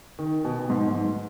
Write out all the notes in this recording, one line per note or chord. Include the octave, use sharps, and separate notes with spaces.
D#3
B2
B2
G#2
G#2